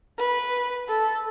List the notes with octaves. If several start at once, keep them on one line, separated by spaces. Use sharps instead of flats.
B4
A4